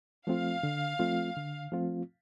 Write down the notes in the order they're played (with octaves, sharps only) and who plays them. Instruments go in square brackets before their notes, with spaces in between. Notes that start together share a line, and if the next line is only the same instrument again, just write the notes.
[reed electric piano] F3 A3 C4 F4 [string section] F5
[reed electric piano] D3
F3 A3 C4 F4
D3
F3 A3 C4 F4